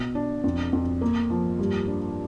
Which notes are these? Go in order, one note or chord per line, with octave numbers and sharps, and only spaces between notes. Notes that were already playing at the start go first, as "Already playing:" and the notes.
Already playing: B2
D4
F2
F2
A#3
F3
G2
D4